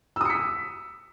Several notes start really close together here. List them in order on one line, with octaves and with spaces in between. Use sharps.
E6 D#6 C#7 B6